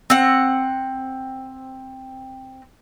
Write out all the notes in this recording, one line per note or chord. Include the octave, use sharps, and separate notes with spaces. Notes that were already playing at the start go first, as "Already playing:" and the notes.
C4 F#5